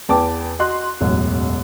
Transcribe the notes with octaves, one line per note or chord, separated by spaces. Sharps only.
E2 B4 G5 A5 D6
F#4 D#5 C6 F#6
E1 A1 F#2